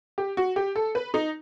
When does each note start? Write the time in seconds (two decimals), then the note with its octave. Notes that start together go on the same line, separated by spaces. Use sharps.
0.18 G4
0.37 F#4
0.56 G4
0.76 A4
0.95 B4
1.14 D#4